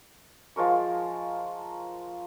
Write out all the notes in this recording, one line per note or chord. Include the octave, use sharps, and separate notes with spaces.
F3 G#3 A#4 C#6